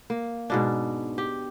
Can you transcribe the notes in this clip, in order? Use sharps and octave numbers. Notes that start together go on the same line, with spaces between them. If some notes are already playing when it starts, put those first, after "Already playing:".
A#3
G#2 B2 D4
G4